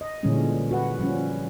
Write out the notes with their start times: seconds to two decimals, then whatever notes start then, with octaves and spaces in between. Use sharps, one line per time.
0.01 D#5
0.23 A#2 D3 E3 G3 G#3 C#4
0.71 F#4 B4 F#5
0.99 F3 G3 C#4